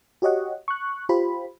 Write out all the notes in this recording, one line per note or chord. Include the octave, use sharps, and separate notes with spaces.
F#4 G4 C#5 D#5 F#5
C#6 F#6
F4 G4 C5 B5